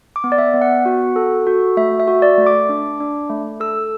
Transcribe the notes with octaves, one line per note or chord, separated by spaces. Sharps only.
D6
B3
D5
E5
B3
F#5
F#4
A4
F#4
A3 E5
E5
F#4
D5
A3
D6
D4
D4
A3
A4 E6